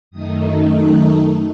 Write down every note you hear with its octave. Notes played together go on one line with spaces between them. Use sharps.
F#2 D#3 A3 D#4 D#6
F#6